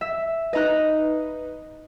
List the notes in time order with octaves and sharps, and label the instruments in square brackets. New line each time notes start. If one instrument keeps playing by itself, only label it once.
[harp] E5
[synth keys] D#4 B4 [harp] D#5 A#5 F#6